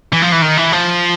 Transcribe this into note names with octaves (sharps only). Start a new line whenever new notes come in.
E3
F3
E3
D#3
E3
F3